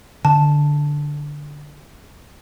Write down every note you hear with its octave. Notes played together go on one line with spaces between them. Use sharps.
D3 A5